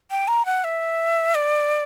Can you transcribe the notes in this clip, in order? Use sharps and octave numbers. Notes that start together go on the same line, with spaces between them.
G5
A#5
F#5
E5
D5